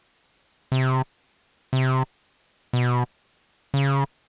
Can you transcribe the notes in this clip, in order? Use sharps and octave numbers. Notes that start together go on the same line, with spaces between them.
C3
C3
B2
C#3